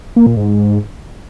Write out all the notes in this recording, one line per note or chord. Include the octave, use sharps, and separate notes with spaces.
A#3
A#2
G#2